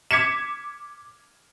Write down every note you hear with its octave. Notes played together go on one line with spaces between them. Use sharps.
D6 G#6 B6 C#7 E7